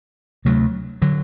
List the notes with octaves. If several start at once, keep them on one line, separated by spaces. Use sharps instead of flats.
D2 C3 F#3 A3
D3 F#3